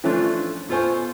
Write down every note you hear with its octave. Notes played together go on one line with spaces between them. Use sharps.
E3 F3 A3 C#4 D4 F4
B2 F4 A4 C5 G#5 C#6